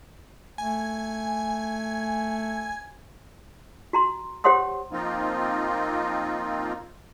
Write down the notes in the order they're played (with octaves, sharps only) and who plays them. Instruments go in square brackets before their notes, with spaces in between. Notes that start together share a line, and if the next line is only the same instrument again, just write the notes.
[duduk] A3 [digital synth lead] G#5
[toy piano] F#4 A#5 C6
G4 C5 C#5 F#5 C6 D#6
[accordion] F3 A#3 C4 D#4 F4